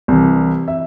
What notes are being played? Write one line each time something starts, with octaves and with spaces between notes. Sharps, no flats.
C2 C3 E3
E5